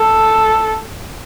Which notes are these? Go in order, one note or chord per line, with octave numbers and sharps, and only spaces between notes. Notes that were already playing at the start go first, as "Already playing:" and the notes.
Already playing: A4